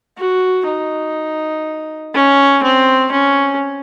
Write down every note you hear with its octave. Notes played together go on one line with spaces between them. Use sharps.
F#4
D#4
C#4
C4
C#4